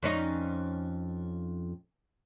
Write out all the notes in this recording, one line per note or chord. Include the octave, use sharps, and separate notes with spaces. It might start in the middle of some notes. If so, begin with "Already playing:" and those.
F2 C#4 D#4